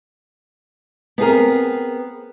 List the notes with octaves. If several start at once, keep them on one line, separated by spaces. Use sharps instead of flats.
B3 C4 G#4 A#4